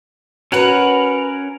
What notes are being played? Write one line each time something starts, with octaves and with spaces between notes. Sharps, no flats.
C#4 F#4 A#4 B4 F#5